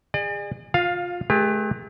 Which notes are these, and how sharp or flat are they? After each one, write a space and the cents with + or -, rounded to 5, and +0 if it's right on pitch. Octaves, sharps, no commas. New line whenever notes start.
G#4 -30 D5 +40
F4 +20 F5 +0
A3 -45 G4 +40 A#4 +30